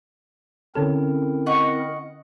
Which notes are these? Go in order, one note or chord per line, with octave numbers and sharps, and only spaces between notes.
D3 C4 C#4 E4 A4 A#4
D#5 F#5 C#6